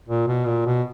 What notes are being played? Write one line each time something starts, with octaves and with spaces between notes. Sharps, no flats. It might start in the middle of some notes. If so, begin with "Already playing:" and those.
A#2
B2
A#2
B2